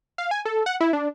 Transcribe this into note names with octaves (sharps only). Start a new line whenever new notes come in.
F5
G#5
A4
F#5
E4
D4